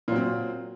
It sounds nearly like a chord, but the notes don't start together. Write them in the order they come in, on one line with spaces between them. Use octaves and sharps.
A#2 F#3 C4